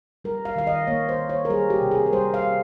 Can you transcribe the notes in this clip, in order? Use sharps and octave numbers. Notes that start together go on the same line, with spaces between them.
G3 A#4
F5
D#3 F5
D#5
A#3 C#5
C5
D#3
C#5
A#4
G3 G#4
G4
C3
G#4
A#4
G3 C5
F5
C3